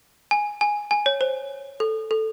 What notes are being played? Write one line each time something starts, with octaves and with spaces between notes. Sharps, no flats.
G#5
G#5
G#5
C#5
C5
A4
A4